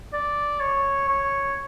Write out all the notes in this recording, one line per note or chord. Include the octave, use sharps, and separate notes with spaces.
D5
C#5
C#5